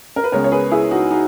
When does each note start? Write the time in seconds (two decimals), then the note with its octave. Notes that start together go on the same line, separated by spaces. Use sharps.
0.16 A#4
0.24 B4
0.32 C#2 C#3 G#3 B3 A#4 C#5
0.44 C#5
0.52 G#4 B4
0.71 E4 G#4
0.91 D#4 F#4
1.11 D#4 F#4